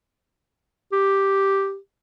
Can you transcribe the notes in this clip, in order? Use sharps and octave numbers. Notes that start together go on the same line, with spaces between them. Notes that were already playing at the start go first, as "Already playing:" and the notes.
G4